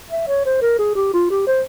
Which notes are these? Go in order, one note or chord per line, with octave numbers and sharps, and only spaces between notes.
E5
C#5
C5
A#4
G#4
G4
F4
G4
C5